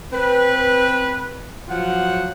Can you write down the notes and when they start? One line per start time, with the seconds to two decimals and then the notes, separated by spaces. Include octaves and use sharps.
0.12 C4 B4
1.68 F3 F#3 F4 F#5